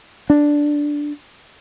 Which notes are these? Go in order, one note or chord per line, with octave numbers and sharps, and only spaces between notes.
D4